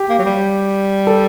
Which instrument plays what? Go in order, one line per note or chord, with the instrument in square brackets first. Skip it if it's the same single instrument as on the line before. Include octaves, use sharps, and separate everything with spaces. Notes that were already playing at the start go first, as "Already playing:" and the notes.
Already playing: [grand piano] G4
[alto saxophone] A#3
F#3
G3
[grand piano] A4